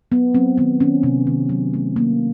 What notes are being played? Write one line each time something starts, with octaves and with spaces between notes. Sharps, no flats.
F#3 B3
F#3 C4
D#3 B3
D#3 C#4
C3
D#3
F#3
A3
A#3